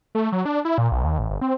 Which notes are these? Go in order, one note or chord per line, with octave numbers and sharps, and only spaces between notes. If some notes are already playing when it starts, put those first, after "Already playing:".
A3
F#3
D4
E4
A#2
B1
D#2
A1
G1
C4